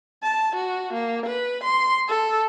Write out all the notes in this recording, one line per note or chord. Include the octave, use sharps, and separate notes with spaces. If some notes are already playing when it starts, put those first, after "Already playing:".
A5
F#4
A#3
B4
C6
A4